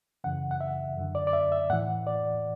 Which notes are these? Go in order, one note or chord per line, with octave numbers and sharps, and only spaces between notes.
F#2 C#3 E3 F#5
F#5
E5
F#2 D3
D5
D5
E5
E5
A2 E3 F#5
D5